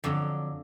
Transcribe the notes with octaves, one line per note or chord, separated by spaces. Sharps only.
F2 D3 F#3